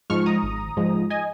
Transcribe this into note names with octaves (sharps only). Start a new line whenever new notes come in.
G#2 F3 G#3 C#6 F6
A#5 D#6
G#1
G#2 F3 G#3
D#5 G#5